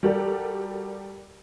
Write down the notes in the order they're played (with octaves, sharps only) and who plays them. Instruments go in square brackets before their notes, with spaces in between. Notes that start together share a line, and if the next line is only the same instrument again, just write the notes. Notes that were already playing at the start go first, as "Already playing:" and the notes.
[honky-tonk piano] G3 F#4 G4 A4 A#4 D5